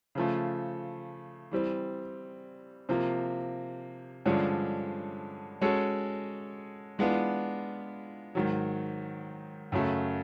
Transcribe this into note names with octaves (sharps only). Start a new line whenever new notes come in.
C#3 F3 A3
E3 G3 C4
C3 F3 A#3
G2 D3 F3 G#3 C#4
G#3 C#4 F#4 A4 C#5
E3 G#3 B3 D4 F4
G#2 D#3 F#3
F#2 C#3 F#3 A3